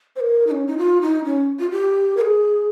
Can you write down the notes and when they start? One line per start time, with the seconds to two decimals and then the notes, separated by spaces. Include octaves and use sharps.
0.16 C5
0.20 A#4
0.47 D#4
0.51 C#4
0.67 D#4
0.78 F4
1.01 D#4
1.25 C#4
1.59 F4
1.71 G4
2.17 A#4
2.21 G#4